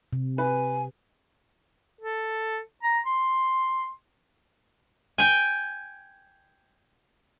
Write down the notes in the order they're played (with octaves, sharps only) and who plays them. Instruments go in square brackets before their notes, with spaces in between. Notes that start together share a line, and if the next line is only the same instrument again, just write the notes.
[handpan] C3
[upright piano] B4 [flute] G#5
[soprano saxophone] A4
A#5
C6
[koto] G5 G#5